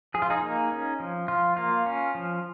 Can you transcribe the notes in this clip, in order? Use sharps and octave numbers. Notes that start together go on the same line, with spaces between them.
F3 G#4
F4
D#4 G#4
A#3
C#4
F3
F3 F4
A#3 F4
C#4
F3